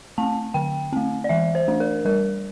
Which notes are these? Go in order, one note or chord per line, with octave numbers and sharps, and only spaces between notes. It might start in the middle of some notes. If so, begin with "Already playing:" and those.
A3 C4 A5
D3 G5
A3 C4
D5
E3 E5
C5
A3 D4
A#4
G3 A#4